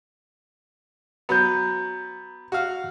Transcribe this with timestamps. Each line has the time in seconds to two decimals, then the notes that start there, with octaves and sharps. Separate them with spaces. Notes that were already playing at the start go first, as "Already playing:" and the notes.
1.29 F#3 B3 A#5 G6
2.52 F#4 F5